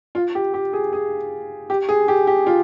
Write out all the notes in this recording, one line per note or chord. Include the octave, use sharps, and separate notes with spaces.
F4
G4
G4
G#4
G#4
G4
G#4
G4
G4
F4